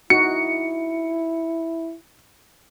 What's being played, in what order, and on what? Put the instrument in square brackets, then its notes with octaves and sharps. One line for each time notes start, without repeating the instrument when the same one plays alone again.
[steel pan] D#4 F#4 [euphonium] E4 [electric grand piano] C#7